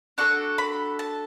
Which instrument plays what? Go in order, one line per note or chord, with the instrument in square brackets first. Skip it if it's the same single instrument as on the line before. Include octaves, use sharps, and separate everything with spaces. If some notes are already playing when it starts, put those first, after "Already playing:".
[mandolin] D4 F#4 A4 C#6
B5
A5